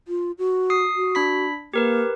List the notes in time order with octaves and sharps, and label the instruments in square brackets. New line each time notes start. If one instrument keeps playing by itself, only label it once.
[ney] F4
F#4
[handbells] D#6 C7
[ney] F#4
[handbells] D4 B5 B6
[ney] A#3 [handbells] G4 A#4 B4